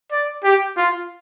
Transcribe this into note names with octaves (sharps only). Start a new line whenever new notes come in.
D5
G4
F4